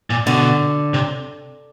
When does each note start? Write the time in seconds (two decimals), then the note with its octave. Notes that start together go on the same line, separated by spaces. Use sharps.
0.10 A#2
0.27 B2 D3
0.94 C3